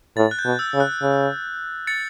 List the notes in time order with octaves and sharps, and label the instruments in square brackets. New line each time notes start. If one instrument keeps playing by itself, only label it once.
[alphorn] A2 [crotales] A6
[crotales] F#6
G6
[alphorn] B2
[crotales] E6
[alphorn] C#3
[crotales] F#6
[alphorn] C#3
[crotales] A6 C#7